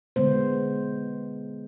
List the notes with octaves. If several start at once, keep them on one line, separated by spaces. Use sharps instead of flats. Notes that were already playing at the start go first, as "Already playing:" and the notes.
D3 G#3 B3 C5